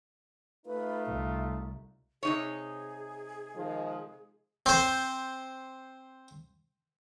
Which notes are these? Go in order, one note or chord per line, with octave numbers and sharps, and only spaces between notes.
A3 D#4 F4 B4
C2 E5
C3 D#4 G#4 C#5
D#3 F3 G#3
C4 C5